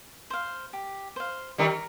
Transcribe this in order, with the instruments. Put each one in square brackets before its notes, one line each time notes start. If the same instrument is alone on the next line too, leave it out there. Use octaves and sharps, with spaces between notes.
[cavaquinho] C5 F5
G4
C5 F5
[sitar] D#3 G3 [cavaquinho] A#4